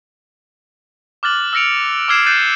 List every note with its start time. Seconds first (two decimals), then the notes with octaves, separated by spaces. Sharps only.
1.23 D6 F6 F#6 A6 F#7
1.53 E6 F6 A#6 C#7 D7 F7
2.08 D6 E6 F6 G#6 C7 E7
2.26 F#6 G6 A6 C7 D#7 E7